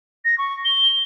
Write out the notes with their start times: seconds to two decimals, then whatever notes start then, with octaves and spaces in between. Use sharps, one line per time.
0.25 A#6
0.38 C#6
0.65 G7